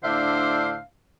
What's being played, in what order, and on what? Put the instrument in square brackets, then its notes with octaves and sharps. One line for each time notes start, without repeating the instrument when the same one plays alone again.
[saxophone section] A2 D3 D4 C5 E5 F5